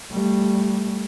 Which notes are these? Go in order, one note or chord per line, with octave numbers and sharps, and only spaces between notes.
G3 A3